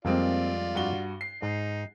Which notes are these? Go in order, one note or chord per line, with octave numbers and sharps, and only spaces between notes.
F2 G3 G#3 A#3 C4 F4 D5
G2 F#4 G7
C7
G#2 D#4